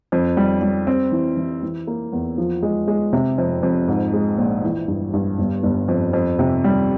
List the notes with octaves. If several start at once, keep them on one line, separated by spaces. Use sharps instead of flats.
F2
G3
G3
C4
E3
E3
E3
A#3
E2
F3
G#3
G#3
C3
F2
F2
G#2
G#3
A#1
E3
G2
G2
G1
G1
F2
F2
C3
G3